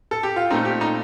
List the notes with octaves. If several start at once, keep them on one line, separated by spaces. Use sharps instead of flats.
A4
G4
F4
A#2 A3 C4 D#4
G4
D#4